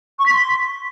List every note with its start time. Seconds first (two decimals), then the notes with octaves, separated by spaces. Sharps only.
0.19 C#6
0.26 B6
0.33 C6